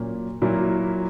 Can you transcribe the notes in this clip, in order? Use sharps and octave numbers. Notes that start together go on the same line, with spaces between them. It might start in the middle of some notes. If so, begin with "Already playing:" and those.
Already playing: A#2 F#3 A#3 C#4
A#2 F#3 A#3 E4